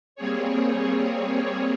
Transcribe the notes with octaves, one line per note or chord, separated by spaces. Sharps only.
G3 A#3 C4 G#4 C#5